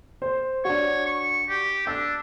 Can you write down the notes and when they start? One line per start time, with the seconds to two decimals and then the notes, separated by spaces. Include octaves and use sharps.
0.22 C5
0.65 D4 F#4 C#5
1.06 C#6
1.49 G4
1.87 D4 E6